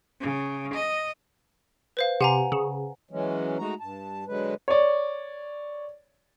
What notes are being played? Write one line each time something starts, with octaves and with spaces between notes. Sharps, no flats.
C#3
D#5
B4 C5 F5
C3 F#5 G#5 A#5
C#3
E3 F#3 G#3 C#4
G#3 A3 D#4 F#4 A#5
G2 A5
D3 F#3 G#3 B4
C#5 D5